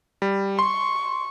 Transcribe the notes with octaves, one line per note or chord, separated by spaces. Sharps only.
G3
C6 C#6